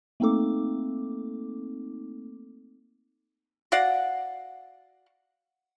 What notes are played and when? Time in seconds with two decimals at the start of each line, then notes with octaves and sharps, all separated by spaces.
0.20 A3 A#3 C4 D#4 A4 D6
3.72 F#4 D5 F5 F#5